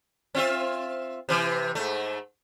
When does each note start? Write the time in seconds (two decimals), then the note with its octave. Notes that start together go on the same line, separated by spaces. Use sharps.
0.35 C4 F4 E5
1.29 C3 E3
1.75 G#2 A3